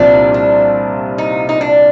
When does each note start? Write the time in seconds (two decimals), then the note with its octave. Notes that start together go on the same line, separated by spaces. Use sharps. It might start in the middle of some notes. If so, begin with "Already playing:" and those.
Already playing: C2 A#2 F3 C4 D4
0.34 D4
1.18 D#4
1.49 D#4
1.61 D4